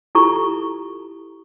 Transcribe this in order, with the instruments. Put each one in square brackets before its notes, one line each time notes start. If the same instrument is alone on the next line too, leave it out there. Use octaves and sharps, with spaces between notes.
[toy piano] E4 F4 G4 A4 A#5 C#6